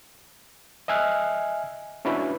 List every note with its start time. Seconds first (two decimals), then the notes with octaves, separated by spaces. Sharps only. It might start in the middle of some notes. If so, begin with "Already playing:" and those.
0.88 D#5 E5 G#5 F6 F#6
2.05 C#4 D4 E4 F#4 B4